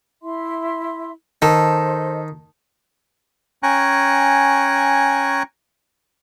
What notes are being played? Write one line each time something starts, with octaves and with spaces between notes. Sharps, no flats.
E4 E5 C6
D#3 A4 C5 D#5
C#4 G5 G#5 A#5 C#6 F#6